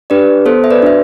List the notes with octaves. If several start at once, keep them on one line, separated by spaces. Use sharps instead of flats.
D4 G4 B4 D5
B3 A4 C5
E5
B4 D5
D4 F#4 E5